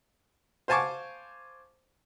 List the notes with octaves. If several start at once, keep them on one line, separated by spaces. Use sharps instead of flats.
C5 F5 G#5 A5 C#6 D6